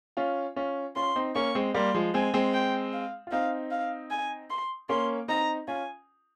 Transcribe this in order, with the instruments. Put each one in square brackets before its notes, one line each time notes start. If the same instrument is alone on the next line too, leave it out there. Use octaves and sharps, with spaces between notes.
[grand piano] C#4 F4
C#4 F4
[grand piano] C#4 F4 [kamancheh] C6
[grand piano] C4 D#4
[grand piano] A#3 C#4 [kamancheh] C#6
[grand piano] G#3 C4
[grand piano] G3 A#3 [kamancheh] C6
[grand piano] F3 G#3
[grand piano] G#3 C4 [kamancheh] G#5
[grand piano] G#3 C4
[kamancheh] G5
F5
[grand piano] F4
[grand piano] C4 D#4 [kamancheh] F5
[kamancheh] F5
G#5
C6
[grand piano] A#3 C#4 [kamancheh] C6
[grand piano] C4 D#4 [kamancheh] A#5
[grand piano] C#4 F4 [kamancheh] G#5